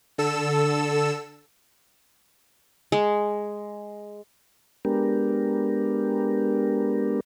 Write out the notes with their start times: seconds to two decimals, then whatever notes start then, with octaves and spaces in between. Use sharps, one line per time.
0.18 D3 A4 E6 E7
2.92 G#3
4.85 G#3 B3 D4 G4 A#4